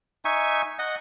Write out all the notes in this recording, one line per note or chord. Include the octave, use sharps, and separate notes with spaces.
D#4 E5 G#5 C#6
D#5 F#5